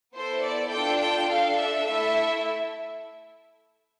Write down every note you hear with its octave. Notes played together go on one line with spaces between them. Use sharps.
B3 E4 A4 C5
D5
D4 F4 A4 G5
G5
D4 A4 F5
E5
A3 E4 A4